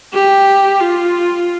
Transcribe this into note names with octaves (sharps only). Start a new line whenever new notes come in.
G4
F4